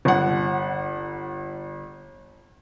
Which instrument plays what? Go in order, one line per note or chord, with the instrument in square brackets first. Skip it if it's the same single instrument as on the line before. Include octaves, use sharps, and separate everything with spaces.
[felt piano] G1 F#5